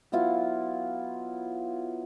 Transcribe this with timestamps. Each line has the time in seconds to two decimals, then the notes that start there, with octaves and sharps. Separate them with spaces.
0.12 F#3 B3 E4 F4